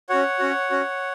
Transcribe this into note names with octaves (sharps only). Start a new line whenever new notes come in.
C#4 F#4 C#5 F#5
C#4 F#4
C#4 F#4